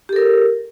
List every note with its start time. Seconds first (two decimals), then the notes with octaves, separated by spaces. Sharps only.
0.09 G4
0.13 A4
0.16 A#4